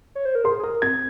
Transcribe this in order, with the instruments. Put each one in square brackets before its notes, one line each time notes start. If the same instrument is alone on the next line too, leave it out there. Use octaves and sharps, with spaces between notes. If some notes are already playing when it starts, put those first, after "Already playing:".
[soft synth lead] C#5
C5
A#4
[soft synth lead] G#4 [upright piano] C6
[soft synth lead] G#4
[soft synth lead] A#4 [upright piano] D#6
[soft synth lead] C4 [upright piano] G#6